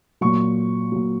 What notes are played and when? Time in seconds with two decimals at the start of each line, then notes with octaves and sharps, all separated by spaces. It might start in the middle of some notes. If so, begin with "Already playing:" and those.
0.21 A#2 F#3 C#6
0.92 A#2 F#3